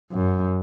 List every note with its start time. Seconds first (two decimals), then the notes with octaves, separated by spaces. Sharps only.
0.12 F#2